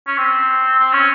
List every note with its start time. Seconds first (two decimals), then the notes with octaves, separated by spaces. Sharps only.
0.07 C#4
0.18 C4
0.79 C4
0.93 C#4